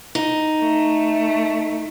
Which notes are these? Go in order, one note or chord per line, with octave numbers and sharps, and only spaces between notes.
D#4
A3